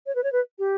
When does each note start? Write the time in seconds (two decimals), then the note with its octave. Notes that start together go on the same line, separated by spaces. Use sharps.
0.06 C#5
0.15 B4
0.24 C#5
0.32 B4
0.59 G4